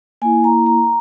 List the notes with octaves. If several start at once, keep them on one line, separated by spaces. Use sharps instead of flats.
A#3 E4 G#5
A#5
A#5